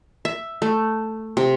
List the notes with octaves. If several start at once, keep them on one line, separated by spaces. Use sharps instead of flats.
E5
A3
C3